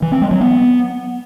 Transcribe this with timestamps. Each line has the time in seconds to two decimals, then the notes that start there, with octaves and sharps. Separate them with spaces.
0.02 E3
0.12 C4
0.22 G#3
0.31 F#3
0.41 B3